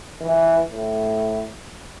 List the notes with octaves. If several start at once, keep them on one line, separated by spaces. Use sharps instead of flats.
E3
A2